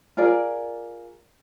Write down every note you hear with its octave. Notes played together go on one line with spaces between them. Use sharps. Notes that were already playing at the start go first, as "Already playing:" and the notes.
F4 G#4 A#4 D5